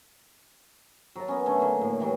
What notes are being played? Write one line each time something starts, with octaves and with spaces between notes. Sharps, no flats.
F#3 A#4 A5
B3 C#4
D3 A3 C#4
D3 A#3
A2 F#3
E3 F#3 G3